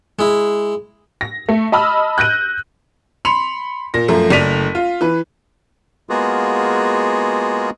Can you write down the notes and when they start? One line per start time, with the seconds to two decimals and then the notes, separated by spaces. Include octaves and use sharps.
0.19 G#3 E4
1.21 A#6
1.49 A3
1.72 D#5 A5 B5 E6 F6
2.18 F#6 G6 A#6 D#7
3.25 B5 C6 C#7 F7
3.94 A#2 A#6
4.08 F#2 F3 A3
4.30 F#1 A3 D5 B6 D#7 F7
4.75 F4
5.01 E3 B4
6.09 G#3 A#3 B3 F4 F#4 G#4